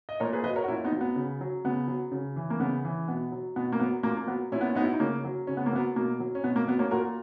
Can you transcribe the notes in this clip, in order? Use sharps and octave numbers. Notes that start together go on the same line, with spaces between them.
D#5
A#2 A#4 C#5
G#4 B4
F#3 B4 D#5
A#4 C#5
F#4
A#2 C#4 E4
B3 D#4
F#3
B3
C#3
F#3
C#3 B3
F#3
C#3
E3
A#3
C#3 B3
E3
B2 B3
F#3
B2 B3
A#3
F#3 B3
A#2 A#3
A#3
F#3 B3
A#2 C#4 E4
B3
C#4
F#3 B3 D#4
E4
D#4
C#3 A#3 C#4
F#3
C#3 C#4
B3
A#3
F#3 B3
B2 A#3
F#3
C#4
B2 B3
A#3
F#3 B3
A#3 C#4
A#2 F#4 A#4